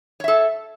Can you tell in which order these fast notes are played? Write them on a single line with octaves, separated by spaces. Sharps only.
C#5 E5 A4